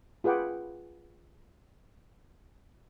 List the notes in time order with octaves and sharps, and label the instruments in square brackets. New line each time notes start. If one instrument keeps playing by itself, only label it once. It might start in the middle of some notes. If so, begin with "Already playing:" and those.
[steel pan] F4 G#4 B4 F#5 G5 D6